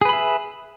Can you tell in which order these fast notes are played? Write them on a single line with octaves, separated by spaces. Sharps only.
G#4 B4 B5 E5